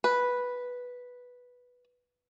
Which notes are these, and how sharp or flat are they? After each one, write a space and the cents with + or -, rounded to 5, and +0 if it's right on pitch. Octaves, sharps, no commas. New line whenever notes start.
B4 -5